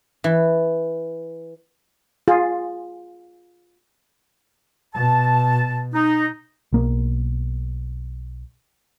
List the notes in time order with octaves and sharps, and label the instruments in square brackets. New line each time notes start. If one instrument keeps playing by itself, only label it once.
[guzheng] E3
[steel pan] F4 G#4
[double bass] B2 [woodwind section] A5
[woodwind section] D#4
[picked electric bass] B1 A#3